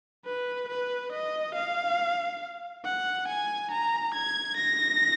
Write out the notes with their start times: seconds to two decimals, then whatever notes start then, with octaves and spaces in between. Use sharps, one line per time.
0.25 B4
0.69 B4
1.12 D#5
1.55 F5
2.84 F#5
3.28 G#5
3.71 A#5
4.14 G#6
4.57 A#6